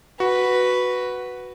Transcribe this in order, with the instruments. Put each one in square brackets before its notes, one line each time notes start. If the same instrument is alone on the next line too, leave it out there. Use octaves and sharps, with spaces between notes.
[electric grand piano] F#4 [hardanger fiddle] B4